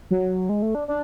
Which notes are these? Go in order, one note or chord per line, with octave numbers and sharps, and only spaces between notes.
F#3
G#3
A3
D4
D4